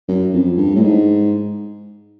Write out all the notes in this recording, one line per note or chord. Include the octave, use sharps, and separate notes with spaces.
F#2
F2
G2
A2
G#2